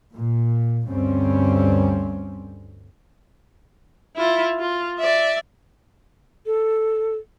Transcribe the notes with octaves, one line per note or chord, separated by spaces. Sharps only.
A#2
D2 G2 G3 C4 C#4
E4 F4
F4
D5 E5
A4